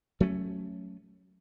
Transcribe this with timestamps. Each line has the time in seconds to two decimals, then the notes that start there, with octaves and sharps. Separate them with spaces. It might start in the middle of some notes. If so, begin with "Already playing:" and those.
0.20 F#3 A3 C#4